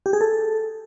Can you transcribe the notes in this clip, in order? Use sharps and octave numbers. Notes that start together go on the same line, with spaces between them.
G4
G#4
A4